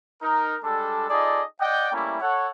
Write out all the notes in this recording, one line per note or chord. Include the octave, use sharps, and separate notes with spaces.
D#4 A#4
G3 G#3 D4 A4
D#4 F4 G#4 A4 D5 D#5
D5 D#5 F#5 G5
G3 A3 A#3 C#4 E4
A4 C#5 F#5